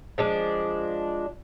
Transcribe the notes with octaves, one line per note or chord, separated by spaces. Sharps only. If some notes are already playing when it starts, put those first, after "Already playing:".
F3 G#3 D4